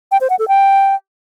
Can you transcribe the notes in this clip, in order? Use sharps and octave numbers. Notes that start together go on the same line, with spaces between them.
G5
C5
F#5
A4
G5